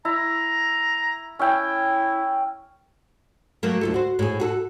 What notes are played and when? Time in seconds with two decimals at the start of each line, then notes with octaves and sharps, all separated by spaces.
0.05 E4 A#5
1.39 C#4 E4 E5 G5
3.63 F#3 A3 A#3
3.81 D2 F4 A4
3.94 F#4 C5
4.19 A2 G#4
4.40 F#4 G#4 A4